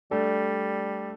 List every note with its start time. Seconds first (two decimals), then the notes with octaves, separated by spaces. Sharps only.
0.11 G3 A3 D4 A4